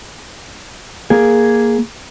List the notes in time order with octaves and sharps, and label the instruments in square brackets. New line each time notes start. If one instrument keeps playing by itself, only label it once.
[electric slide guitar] A#3 G#4